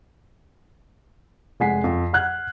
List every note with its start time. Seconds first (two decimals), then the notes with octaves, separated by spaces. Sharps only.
1.60 F1 G#3 F#5 G#5 B6 C7
1.84 F2
2.13 F#5 F6 F#6 G#6